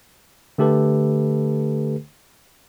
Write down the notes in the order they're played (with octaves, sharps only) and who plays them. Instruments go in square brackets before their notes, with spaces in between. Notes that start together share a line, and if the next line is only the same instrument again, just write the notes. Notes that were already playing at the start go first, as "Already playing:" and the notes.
[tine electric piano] D3 A3 G4 A4 B4